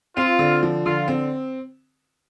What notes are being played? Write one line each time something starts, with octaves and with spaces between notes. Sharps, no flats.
C4 F4
D3
F3
D3 F4
C4